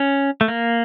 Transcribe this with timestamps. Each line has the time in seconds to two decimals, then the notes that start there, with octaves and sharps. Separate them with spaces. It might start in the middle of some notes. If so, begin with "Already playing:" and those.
Already playing: C#4
0.41 A3
0.48 A#3